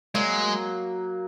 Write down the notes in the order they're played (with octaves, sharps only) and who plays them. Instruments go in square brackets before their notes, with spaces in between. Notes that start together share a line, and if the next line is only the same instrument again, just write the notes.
[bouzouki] F#3 A#3 [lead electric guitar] G#3